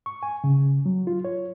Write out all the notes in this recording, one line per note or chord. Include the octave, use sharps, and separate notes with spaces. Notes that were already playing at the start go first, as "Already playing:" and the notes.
C#6
G#5
C#3
F#3
F4
C#5